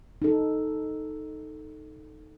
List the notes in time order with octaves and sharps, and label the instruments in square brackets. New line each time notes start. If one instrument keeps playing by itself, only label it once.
[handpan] D#4 A4